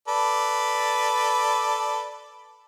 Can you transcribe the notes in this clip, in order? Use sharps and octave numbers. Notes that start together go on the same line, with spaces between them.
A4 B4 D5